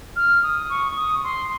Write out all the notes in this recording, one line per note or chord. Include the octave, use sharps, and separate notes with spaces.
F6
D#6
C#6
D#6
C6